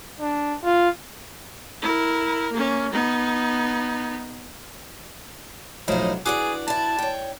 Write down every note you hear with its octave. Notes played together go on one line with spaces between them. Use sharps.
D4
F4
E4 A#4
A#3 C#4
B3 D#4
B1 A2 D3 F3 F#3 D#4
E3 D4 F#4 G#4 D5 D6
E4 D5 A5
C#5 G5